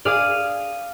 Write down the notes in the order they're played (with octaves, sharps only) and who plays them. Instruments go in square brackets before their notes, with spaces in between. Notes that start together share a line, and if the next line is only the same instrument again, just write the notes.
[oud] G#4 D5 [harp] F5 D#6 F6